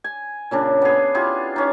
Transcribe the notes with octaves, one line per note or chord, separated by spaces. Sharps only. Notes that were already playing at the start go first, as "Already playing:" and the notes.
G#5
A#2 C#3 D4
B3 G#4
E4 F4 G4 G#4
C#4 D#4